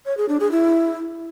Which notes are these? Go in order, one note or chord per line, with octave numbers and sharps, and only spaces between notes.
C#5
G#4
D4
G#4
E4